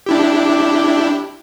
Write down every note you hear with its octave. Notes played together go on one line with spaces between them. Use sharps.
D4 E4 G4